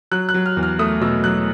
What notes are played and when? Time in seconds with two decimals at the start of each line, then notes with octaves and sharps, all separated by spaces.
0.11 F#3 F#6
0.29 F#6
0.34 F#3
0.46 F6
0.57 E2
0.63 F6
0.79 A3 D#6
1.01 B2 E6
1.24 F#3 F#6